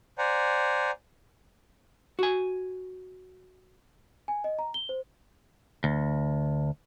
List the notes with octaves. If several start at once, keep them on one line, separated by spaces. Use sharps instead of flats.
C5 D5 F#5 G#5 A#5
F#4 G#5
G#5
D#5
A#5
G7
C5
D2